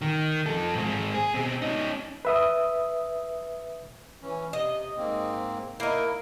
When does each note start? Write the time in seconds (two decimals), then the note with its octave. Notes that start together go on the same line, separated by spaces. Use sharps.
0.02 D#3
0.46 F3 A4
0.74 G#2 C4
1.14 G#4
1.34 B2 C4
1.62 C#4 D#4
2.25 B4 E5 D#6
4.22 E3 C#4
4.53 C3 D#5
4.97 G#2 A#3 C4
5.80 A#3 D#4 E4 A#4